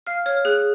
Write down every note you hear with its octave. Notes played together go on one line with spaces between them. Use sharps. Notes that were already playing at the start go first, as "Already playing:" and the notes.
F5 F6
C#5 F6
G#4 F#6